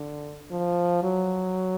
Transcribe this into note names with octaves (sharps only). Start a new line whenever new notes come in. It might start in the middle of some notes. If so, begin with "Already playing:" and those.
Already playing: D3
F3
F#3